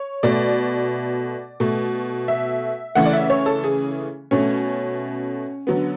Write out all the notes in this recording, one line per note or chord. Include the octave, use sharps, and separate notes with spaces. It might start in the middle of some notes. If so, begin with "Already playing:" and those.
Already playing: C#5
B2 A3 D5
B2 A3
E5
C#3 E3 A3 F#5
D5
E5
C#5
A4
G#4
B2 A3 C#4
D3 F#3 B3